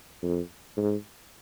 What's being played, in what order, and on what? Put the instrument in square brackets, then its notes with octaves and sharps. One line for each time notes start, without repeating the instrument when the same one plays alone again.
[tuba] F2
G#2